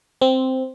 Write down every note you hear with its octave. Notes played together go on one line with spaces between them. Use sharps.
C4